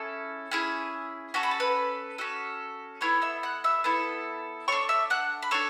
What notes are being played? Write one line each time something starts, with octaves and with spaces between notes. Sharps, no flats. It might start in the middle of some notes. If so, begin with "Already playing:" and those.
Already playing: C#4 E4 G#4 A4
C#4 E4 G#4
C#4 F#4 A4 C#6
B5
A5
B4 B5
C#4 F#4 A4
B3 E4 A4 C#5 C#6
E5 E6
F#5 F#6
E5 E6
B3 E4 A4
D4 A4 C#5 C#6
E5 E6
F#5 F#6
B5
D4 A4 C#5 C#6